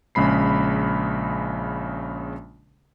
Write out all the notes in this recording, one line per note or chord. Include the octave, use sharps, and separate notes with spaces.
A#1 C#3 G#3 B5 C7